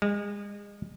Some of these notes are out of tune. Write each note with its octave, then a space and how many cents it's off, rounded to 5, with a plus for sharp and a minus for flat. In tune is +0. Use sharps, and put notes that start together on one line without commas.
G#3 -30